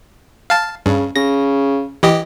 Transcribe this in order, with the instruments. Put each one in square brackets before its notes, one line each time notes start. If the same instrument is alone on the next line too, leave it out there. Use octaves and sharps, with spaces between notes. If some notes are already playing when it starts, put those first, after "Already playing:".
[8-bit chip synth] F5 A5
[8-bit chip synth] G2 [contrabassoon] C#3
[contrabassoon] C#3 [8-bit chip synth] A#6
[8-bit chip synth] E3 G4 D#5